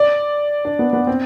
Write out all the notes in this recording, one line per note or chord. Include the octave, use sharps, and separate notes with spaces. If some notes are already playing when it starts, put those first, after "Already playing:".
Already playing: D5
D4
B3
B3
C4